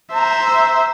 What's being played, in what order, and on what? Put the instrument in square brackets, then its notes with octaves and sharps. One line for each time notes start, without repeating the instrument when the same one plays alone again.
[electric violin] C5 E5 [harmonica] A#5